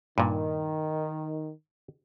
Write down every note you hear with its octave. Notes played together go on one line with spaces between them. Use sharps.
G2 A#2 D#3